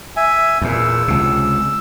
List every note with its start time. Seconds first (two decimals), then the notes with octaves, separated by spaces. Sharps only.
0.17 E5 G#5
0.61 E2 A#2
0.73 E6
1.08 C#2 C3